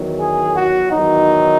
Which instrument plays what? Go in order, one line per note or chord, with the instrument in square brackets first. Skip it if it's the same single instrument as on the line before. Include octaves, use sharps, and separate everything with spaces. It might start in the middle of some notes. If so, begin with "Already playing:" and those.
Already playing: [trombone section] E2 D#3 F#3
G#4
F#4
E2 D#3 F#3 D#4